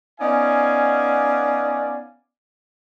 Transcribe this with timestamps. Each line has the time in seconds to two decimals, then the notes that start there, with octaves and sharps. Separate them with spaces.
0.20 B3 C#4 D#4 D5 F5 G#5